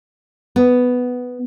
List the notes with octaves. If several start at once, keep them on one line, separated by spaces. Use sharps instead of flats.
B3